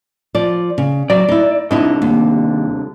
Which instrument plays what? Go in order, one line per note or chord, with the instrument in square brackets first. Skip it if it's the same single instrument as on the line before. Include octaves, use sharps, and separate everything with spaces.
[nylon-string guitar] F3 D5
C#3
[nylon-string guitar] F#3 [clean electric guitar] D5
[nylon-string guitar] D#4 E4
[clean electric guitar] C2 D3 [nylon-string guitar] D#4 E4 D#5
[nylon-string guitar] D#2